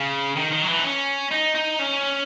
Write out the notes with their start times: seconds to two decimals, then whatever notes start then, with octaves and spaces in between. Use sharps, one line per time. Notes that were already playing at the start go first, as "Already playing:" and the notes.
Already playing: C#3
0.36 D#3
0.52 D#3
0.62 F#3
0.67 E3
0.77 D#4
0.84 C#4
1.31 D#4
1.55 D#4
1.79 C#4